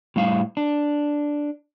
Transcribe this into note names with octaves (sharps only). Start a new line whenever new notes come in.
A2 G3 F5
D4